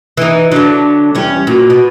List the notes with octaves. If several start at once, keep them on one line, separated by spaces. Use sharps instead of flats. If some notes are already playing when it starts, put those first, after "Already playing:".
E3 D#4
D3 F#3 D4
E2 G3 C#4
A#2 F#4
B2